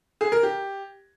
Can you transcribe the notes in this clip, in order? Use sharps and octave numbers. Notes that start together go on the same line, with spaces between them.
G#4
A#4
G4